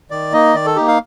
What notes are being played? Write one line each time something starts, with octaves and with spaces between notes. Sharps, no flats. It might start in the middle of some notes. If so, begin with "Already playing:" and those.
D#3 D5
A#3 D#4 D#5
D#3 D5
A4
A#3 D#4 G4
F5